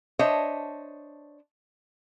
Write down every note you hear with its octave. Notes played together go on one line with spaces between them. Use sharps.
D4 C5 C#5 D#5 E5